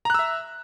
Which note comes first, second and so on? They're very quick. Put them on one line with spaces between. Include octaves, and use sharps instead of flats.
A#5 F#6 E6 E5